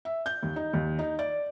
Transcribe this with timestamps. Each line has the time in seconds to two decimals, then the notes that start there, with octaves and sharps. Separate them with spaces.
0.05 E5
0.26 G6
0.43 D#2
0.56 D#4
0.73 D#2
0.99 D#4
1.19 D5